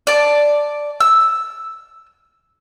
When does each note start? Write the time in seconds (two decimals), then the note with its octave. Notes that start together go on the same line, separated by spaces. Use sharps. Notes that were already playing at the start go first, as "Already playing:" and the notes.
0.07 D5 A5
1.00 E6